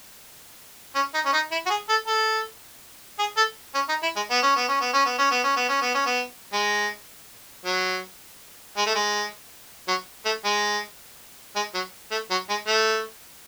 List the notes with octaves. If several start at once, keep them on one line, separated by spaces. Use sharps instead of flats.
C#4
D#4
C#4
D#4
E4
F#4
G#4
A4
A4
G#4
A4
C#4
D#4
E4
G#3
B3
C#4
B3
C#4
B3
C#4
B3
C#4
B3
C#4
B3
C#4
B3
C#4
B3
G#3
F#3
G#3
A3
G#3
F#3
A3
G#3
G#3
F#3
A3
F#3
G#3
A3